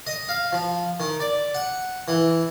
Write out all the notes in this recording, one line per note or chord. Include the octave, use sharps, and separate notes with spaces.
D#5
F5
F3
D#3
D5
F#5
E3